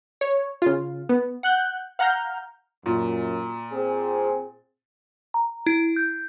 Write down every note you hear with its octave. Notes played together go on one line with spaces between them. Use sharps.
C#5
C#3 F4
B3
F#5 F#6 G6
F5 F#5 A#5 F6 G6
F#2 A#2
C4 G#4
A#5
E4
G6